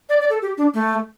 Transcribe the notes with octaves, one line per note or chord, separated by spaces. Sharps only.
D5
D5
A4
G4
D4
A3